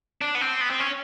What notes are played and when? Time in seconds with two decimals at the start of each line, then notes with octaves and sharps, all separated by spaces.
0.22 D4
0.35 B3
0.41 C4
0.61 B3
0.70 C4
0.80 C#4